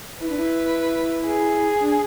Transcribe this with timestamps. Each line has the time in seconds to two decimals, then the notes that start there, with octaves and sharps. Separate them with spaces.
0.20 E4 B4
0.30 D4
0.37 E4
1.27 G#4
1.80 D4